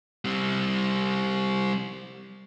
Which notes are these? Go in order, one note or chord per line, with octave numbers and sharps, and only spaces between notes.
G3 C4